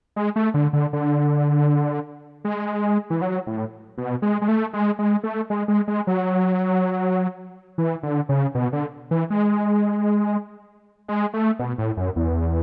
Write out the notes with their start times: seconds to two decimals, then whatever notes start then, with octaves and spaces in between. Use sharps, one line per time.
0.16 G#3
0.36 A3
0.54 D3
0.73 D3
0.93 D3
2.45 G#3
3.10 E3
3.21 F#3
3.47 A2
3.98 B2
4.22 G#3
4.42 G#3
4.48 A3
4.73 G#3
4.99 G#3
5.23 A3
5.50 G#3
5.68 G#3
5.88 G#3
6.07 F#3
7.78 E3
8.03 D3
8.29 C#3
8.55 B2
8.73 D3
9.11 E3
9.30 G#3
11.08 G#3
11.34 A3
11.59 B2
11.78 A2
11.97 F#2
12.16 E2